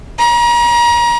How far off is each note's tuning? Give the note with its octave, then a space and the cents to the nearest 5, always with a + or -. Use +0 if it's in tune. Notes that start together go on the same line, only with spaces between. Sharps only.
A#5 +35